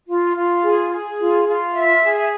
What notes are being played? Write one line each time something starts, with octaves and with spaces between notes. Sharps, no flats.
F4
F4
G#4
G#4
F4
F4
E5
G#4